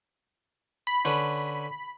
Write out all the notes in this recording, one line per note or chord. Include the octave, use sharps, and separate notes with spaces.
B5
D3 C#4 B4